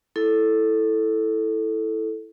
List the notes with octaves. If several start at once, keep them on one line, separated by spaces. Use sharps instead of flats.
E4 A4